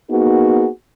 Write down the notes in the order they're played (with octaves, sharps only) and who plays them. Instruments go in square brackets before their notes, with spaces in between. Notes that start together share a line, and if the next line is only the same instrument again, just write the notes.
[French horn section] A#3 B3 D#4 F#4 G#4